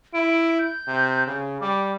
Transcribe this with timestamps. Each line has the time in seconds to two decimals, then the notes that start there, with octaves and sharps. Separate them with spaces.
0.14 E4 D7
0.59 G6
0.88 C3
1.26 C#3
1.61 G3 D6